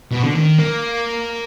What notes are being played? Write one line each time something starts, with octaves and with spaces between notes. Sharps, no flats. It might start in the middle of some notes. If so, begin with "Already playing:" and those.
B2
D3
D#3
A#3